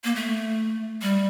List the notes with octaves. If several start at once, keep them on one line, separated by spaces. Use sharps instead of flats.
A#3
A3
G3